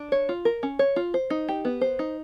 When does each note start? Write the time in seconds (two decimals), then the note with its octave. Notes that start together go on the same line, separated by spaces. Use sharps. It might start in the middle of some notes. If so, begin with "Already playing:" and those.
Already playing: D4
0.12 C#5
0.29 F4
0.45 A#4
0.63 C#4
0.79 C#5
0.96 F4
1.14 C5
1.30 D#4
1.48 G4
1.65 B3
1.81 C5
1.99 D#4